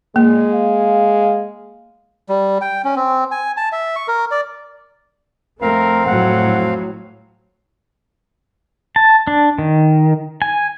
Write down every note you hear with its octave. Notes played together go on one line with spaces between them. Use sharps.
A#2 G#3 A#3
F5
G3
G5
C#4
C4
G#5
A5
E5
C#6
A#4
D5
F2 A3 C4 A#4 F5
A2 F#3 F#5
A5
D4
D#3
G#5